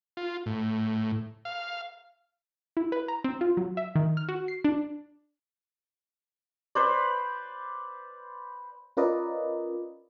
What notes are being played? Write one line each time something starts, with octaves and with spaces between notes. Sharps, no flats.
F4
A2
F5
E4
B4
A#5
C4
F4
F#3
E5
D#3
F6
F#4
C7
D4
B4 C5 D5
C#4 F4 A#4 B4 D5 D#5